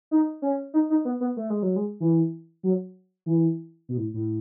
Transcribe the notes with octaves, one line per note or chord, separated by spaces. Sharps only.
D#4
C#4
D#4
D#4
B3
B3
A3
G#3
F#3
G#3
E3
F#3
E3
B2
A2
A2